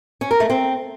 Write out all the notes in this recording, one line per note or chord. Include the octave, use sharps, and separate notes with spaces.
C#4
A#4
A3
C4